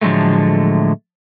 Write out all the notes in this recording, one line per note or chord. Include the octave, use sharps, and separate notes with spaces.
A2 D3 F3 F#3 G#3 A3